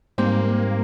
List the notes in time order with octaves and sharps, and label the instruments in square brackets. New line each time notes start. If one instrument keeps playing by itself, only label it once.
[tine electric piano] G#2 G3 C4 G4 C5 [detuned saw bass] A#3